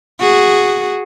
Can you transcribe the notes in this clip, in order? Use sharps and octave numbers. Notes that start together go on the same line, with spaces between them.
F#4 G#4